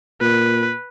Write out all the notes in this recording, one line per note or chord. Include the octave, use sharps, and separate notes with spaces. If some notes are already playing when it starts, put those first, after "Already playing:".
A#2 B4